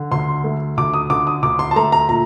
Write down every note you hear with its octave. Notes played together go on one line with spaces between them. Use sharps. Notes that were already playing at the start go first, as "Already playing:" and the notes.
Already playing: D3
D2 C6
A3
D2 D6
D#6
D3 D6
D#6
D2 D6
C6
A5
A3 A#5
A#5
A#2 A#5